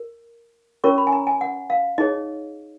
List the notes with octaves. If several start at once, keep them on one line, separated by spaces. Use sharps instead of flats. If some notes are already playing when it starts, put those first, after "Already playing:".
Already playing: A#4
C#4 F4 A#4 C#5 C#6
B5
G#5
A#5
G#5
F#5
F5
D#4 G#4 C#5 D#5